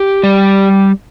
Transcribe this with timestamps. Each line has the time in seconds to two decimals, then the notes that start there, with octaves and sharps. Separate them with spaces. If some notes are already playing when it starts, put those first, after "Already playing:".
Already playing: G4
0.23 G3